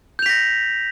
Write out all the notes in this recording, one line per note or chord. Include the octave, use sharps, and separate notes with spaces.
G6 A#6 B6 F7